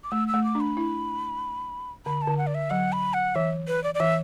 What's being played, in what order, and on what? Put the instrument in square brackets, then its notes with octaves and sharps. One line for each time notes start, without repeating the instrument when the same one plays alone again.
[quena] D6
[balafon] A3 [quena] E6
[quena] E6
[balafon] A3
[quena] D6
[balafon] D4
[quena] B5
[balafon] E4
[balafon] D3 [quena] B5
[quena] A5
[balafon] D3
[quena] F#5
D5
E5
[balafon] F#3 [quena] F#5
[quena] B5
F#5
[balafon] E3 [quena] E5
[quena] B4
D5
D5
[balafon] E3 [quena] E5